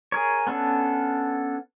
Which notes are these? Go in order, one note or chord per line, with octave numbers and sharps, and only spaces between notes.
G#4 A#4 C#5
B3 C#4 D4 A4